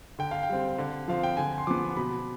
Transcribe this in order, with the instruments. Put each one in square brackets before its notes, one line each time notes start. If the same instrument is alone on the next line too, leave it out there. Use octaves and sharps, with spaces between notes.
[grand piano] D3 G5
F5
G5
G3 C4
D3
F3 C4 F5
G5
D3 G#5
C6
F3 B3 D6
B2 B5